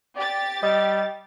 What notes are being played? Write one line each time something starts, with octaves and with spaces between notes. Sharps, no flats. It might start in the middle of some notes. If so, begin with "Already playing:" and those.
G4 D5 A6
G3 D#5